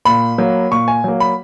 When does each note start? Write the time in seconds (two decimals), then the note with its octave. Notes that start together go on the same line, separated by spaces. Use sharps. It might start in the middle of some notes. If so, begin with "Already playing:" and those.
0.05 A#2 B5
0.38 F#3 A#3
0.71 A#2 C#6
0.88 G#5
1.04 F#3 A#3
1.20 B5